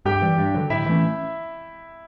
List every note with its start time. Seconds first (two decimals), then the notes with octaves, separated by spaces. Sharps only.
0.05 G2 G4 G5
0.22 E3 G3
0.38 G2
0.54 D3 F#3
0.70 A2 E4 E5
0.86 E3 A3 C#4